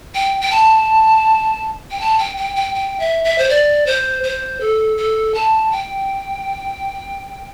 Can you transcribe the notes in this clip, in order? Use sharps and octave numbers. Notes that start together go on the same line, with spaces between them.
G5
G5
A5
G5
A5
G5
G5
G5
G5
E5
E5
C5
D5
C5
C5
A4
A4
A5
G5